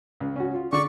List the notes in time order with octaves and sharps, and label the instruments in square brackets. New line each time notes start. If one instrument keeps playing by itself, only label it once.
[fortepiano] C#2
C#4 F#4
F4
[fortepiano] D3 [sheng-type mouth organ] D5 C#6